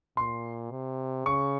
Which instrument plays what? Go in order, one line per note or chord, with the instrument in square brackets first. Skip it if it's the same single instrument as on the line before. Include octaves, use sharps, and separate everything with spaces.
[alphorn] A#2 [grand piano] C6
[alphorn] C3
[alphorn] C#3 [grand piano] C#6